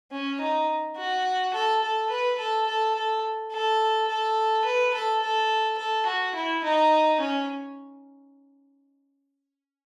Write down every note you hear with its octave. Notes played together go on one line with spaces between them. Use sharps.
C#4
D#4
F#4
A4
A4
B4
A4
A4
A4
A4
A4
B4
A4
A4
A4
F#4
E4
D#4
C#4